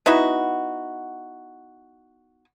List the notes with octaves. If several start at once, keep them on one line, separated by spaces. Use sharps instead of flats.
B3 D#4 E4 F#4